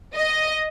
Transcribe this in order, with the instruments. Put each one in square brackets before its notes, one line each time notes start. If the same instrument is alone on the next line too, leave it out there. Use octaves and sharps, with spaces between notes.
[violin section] D#5